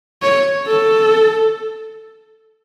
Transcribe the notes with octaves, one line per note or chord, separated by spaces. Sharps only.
C#5
A4